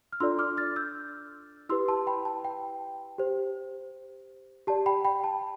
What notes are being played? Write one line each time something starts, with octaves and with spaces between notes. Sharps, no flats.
F6
D4 F4 A4 D5 C6 E6
D6 F6
F6 A6
E6 G6
E4 G4 B4 C6 E6
A5 C6
G5 B5
A5
G5
G4 C5
G4 D5 A5
G5 B5
G5 B5
A5